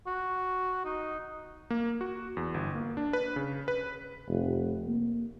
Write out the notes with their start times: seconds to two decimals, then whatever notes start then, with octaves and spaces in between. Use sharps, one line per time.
0.07 F#4
0.85 D#4
1.70 A#3
2.01 F#4
2.37 E2
2.54 G1
2.75 A#3
2.97 D4
3.13 B4
3.36 C#3
3.68 B4
4.28 F1
4.87 A#3